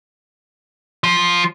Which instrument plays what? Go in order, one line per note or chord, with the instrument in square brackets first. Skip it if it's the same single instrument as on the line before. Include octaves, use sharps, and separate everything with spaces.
[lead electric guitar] F3